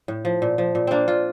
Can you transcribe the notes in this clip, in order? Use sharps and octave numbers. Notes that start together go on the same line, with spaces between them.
A2
F3
A#2
F3
A#2
A#3 C4 D4
A#2 F4